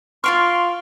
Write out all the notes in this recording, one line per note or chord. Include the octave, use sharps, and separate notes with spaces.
F4 F5 C6 C#6 F6 D7